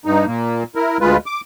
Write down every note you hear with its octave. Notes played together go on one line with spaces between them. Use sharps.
G2 D#4
A#2 A#3
E4 A#4
D2 G#3 F4 B4
D6